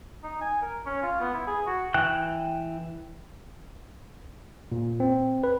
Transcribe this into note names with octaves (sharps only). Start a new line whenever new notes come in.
D#4
G#5
A#4
C#4
F4
B3
E4
G#4
F#4
E3 G5 F#6
A#2
C4
B4